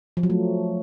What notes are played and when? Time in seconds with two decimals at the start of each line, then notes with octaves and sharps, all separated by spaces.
0.17 F3
0.23 F#3
0.30 A3